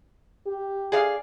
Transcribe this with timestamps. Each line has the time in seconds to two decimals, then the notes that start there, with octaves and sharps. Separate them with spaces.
0.47 G4
0.92 G#4 D5 F5